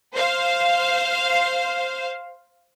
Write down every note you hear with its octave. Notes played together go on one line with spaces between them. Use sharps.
C5 F5